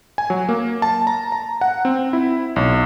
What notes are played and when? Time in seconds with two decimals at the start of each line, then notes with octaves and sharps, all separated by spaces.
0.18 G#5
0.30 F#3
0.49 A#3
0.82 A5
1.07 A#5
1.32 A#5
1.61 F#5
1.85 C4
2.13 E4
2.56 B1